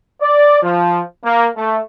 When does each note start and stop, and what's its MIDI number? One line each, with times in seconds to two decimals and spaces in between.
0.21 0.62 74
0.62 0.99 53
1.23 1.47 58
1.56 1.79 57